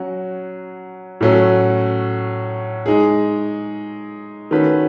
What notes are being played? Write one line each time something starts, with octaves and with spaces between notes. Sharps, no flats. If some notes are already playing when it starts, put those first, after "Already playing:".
Already playing: F#3 C#4 F#4
A2 F#3 A3 C#4 F#4
G#3 D#4 G#4
D#3 A3 C#4 F#4 B4